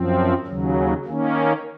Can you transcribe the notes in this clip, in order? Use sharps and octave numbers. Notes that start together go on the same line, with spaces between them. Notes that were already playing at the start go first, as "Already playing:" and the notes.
Already playing: F#2 F3 C4
D#2 C#3 F#3
D#3 A#3 C#4